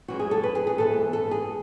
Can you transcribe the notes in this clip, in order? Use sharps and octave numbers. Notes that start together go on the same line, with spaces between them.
F#2 E3 G#3 F#4
G#4
A4
B4
G#4
G#4
G#2 E3 B3 A4
A4
G#4